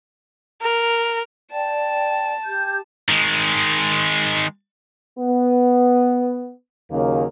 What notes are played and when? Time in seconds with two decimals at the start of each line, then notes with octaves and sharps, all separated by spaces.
0.62 A#4
1.51 D5 G5 A5
2.46 G4 G6
3.09 D#3 G#3
5.19 B3
6.92 D#2 C#3 F#3 A#3